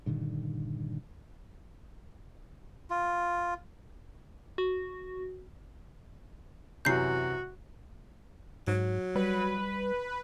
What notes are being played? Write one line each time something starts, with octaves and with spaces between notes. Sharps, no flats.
G2 A#2 D3 D#3
F4
F#4
F#2 C3 E3 F#4 G6 C7
G#2 F#3
G3 B4